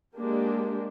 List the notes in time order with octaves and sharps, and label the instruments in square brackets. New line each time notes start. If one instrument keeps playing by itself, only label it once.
[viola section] G#3 A#3 D4 G4